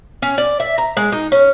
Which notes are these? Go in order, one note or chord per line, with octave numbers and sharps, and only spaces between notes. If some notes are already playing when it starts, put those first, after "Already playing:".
C#4
D5
E5
A#5
G#3
D#4
C#4